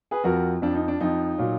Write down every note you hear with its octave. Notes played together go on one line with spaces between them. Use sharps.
G#4 B4
F2 F3 F#4 A#4
F2 F3 D4
D#4
D4
F2 F3 D#4
A#2 F#3